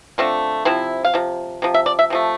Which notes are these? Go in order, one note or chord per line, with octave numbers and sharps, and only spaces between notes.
D3 A3 C4 F4
C3 F3 C4 E4
F5
C3 F3
C3 F3
E5
D5
E5
C3 F3 A3